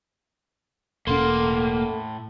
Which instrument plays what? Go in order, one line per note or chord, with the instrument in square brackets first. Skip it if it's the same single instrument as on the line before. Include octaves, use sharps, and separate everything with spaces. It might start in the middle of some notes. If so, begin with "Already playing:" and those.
[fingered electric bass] E1 C#4 [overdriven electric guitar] A2 C6 [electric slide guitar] A#3 [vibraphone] A4 F#5